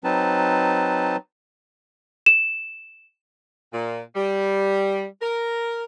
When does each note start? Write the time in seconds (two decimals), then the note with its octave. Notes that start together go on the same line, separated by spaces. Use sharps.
0.04 F#3 C4 D#4 B4 A5
2.26 E7
3.73 A#2
4.16 G3
5.21 A#4